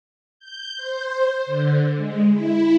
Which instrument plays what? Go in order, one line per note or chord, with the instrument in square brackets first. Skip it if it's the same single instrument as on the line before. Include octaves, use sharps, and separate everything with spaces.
[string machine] G6
C5
D3
G#3
E4